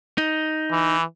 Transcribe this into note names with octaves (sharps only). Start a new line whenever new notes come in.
D#4
E3